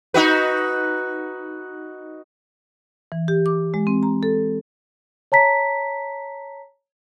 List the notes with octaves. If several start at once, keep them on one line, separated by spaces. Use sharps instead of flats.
D#4 F#4 B4
E3
G4
D6
G#3
C4
A#5
A4
C#5 A5 A#5 B6